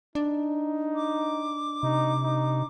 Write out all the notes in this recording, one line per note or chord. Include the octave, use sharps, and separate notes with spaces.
D4 D#4
D6
C3 D#4
D#4